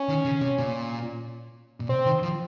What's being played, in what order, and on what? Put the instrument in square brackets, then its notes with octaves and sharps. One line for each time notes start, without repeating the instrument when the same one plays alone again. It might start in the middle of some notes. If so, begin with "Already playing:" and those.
Already playing: [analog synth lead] C#4
[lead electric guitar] D#3
C#3
C3
A#2
A#2
[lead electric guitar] C3 [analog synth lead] C4
[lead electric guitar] D#3
F3